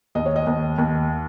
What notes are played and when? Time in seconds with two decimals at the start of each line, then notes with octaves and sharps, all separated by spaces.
0.15 D#2 D#5
0.26 C#5
0.36 D#5
0.47 D#2
0.78 D#2